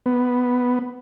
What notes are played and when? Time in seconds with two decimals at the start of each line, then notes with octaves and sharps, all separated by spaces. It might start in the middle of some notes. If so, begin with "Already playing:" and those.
0.06 B3